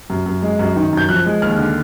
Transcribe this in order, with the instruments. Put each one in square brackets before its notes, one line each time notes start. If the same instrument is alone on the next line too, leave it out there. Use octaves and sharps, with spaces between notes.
[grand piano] F#2
F#2
G#3
F#2
D#3
F#2 G6
F3 F#6
G#3
D#2 F6
D3